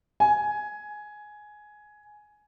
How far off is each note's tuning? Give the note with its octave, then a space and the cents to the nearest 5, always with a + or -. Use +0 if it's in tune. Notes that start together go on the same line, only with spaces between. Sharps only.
G#5 +10